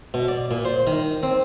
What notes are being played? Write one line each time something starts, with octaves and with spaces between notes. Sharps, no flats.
B2
D5
A#2
C5
D#3
C4